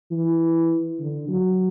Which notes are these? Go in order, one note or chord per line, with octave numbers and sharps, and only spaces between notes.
E3
D3
F#3